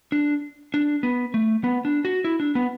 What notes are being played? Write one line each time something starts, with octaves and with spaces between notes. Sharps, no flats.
D4
D4
B3
A3
B3
D4
F#4
E4
D4
B3